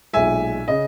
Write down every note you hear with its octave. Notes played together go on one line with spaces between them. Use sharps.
B1 A#2 G#3 E5 G#5
C#3 D#5